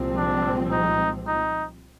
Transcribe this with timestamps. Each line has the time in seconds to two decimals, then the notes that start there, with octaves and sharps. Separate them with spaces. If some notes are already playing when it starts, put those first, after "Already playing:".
Already playing: C2 A#2 F3 G#3 C4
0.17 D4
0.72 D#4
1.27 D#4